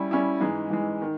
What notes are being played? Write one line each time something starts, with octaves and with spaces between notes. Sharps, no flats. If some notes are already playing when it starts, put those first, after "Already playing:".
Already playing: G3 C#4 E4
G3 C#4 E4
G#2 E3 G#3
G#2 E3 G#3
D#3